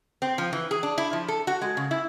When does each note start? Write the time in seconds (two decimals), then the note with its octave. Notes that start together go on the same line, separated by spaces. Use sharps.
0.22 C4
0.38 F3
0.53 E3
0.71 G#4
0.83 D4
0.98 E4
1.13 F3
1.28 A4
1.47 F#4
1.62 G#3
1.77 C#3
1.91 E4